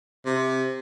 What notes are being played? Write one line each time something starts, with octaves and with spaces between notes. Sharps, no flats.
C3